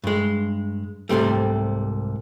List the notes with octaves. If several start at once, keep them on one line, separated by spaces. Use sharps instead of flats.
G2 G#3
C2 G#2 C3 G3 A3